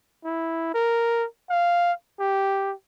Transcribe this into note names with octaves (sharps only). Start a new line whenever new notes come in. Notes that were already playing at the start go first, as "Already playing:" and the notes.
E4
A#4
F5
G4